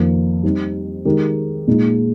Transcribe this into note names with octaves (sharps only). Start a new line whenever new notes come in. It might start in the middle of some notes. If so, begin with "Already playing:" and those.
Already playing: F2 D#3 A#3
G3 C4 D#4
D#3 G#3 D#4 G4 A#4
A#2 G#3 D#4